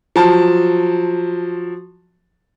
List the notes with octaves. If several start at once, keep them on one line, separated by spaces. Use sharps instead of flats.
F3 F#3 A5